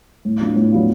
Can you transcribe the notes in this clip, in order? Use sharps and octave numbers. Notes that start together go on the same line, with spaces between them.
A2
F#3 B3 D4 F4
A2
F#3 B3 D4 F4